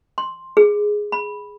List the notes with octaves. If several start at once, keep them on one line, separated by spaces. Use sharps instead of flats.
C6
G#4
B5